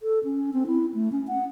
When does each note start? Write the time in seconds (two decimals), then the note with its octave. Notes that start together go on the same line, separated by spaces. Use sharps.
0.01 A4
0.24 C#4
0.53 C4
0.67 E4
0.94 A3
1.12 C#4
1.28 F#5